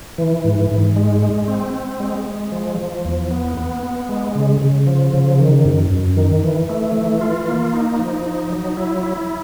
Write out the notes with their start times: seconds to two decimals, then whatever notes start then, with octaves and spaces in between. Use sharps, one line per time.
0.18 E3
0.45 G#2
0.71 G#2
0.96 G#3
1.22 G#3
1.48 C4
1.74 C4
2.00 G#3
2.26 G#3
2.52 F3
2.78 F3
3.05 E2
3.31 B3
3.57 B3
3.83 B3
4.09 G#3
4.35 C#3
4.61 C#3
4.87 F3
5.14 C#3
5.39 D#3
5.65 F#2
5.91 F#2
6.17 D#3
6.44 E3
6.69 A3
6.96 E3
7.21 F4
7.48 A#3
7.73 D#4
7.99 F3
8.26 D#4
8.52 F#3
8.77 E4
9.03 E4